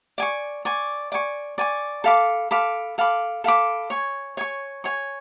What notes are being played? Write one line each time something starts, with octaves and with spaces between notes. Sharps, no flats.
D5 G#5 C#6
D5 G#5 C#6
D5 G#5 C#6
D5 G#5 C#6
A4 F5 B5 D6
A4 F5 B5 D6
A4 F5 B5 D6
A4 F5 B5 D6
C#5 G#5 C#6
C#5 G#5 C#6
C#5 G#5 C#6